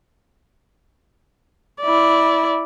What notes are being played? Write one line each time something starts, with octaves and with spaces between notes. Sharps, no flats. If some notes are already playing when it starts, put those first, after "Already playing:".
E4 D5